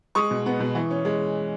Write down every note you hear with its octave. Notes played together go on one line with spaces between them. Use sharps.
G#3 C#6 D#6
B2
B3
B2
E3
C#4
G#3